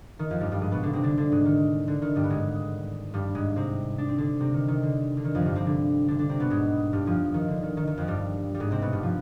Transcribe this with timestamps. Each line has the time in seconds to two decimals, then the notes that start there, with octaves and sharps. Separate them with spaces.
0.19 D#3
0.30 F2 F3
0.40 G2 G3
0.51 G2 G3
0.61 G#2 G#3
0.72 B2 B3
0.83 D3 D4
0.93 C3 C4
1.03 D3 D4
1.17 D3 D4
1.32 G#2 G#3
1.45 D#3
1.88 D3
2.02 D#3
2.16 G2 G3
2.24 B3
2.30 G#2 G#3
3.14 G2 G3
3.35 G#2 G#3
3.56 C3 C4
3.98 D4
4.08 C4
4.18 D3 D4
4.40 C3 C4
4.54 D#3
4.68 D#3
4.83 D3
5.17 D3
5.24 D#3
5.35 F2 F3
5.45 G2 G3
5.55 C3 C4
5.66 D3 D4
6.08 D3 D4
6.19 D3 D4
6.29 C3 C4
6.40 B2 B3
6.50 G#2 G#3
6.93 G2 G3
7.06 F2 F3
7.34 D#3
7.48 D3
7.63 D#3
7.77 D#3
7.87 D#3
7.97 F2 F3
8.07 G2 G3
8.55 G3
8.60 G#2 G#3
8.71 C3 C4
8.82 B2 B3
8.92 G2 G3
9.03 F3